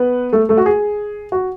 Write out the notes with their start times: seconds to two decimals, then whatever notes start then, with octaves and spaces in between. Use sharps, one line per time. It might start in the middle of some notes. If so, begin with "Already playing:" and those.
Already playing: B3 B4
0.33 A3 A4
0.49 A3 A4
0.58 F#4
0.66 G#4
1.32 F#4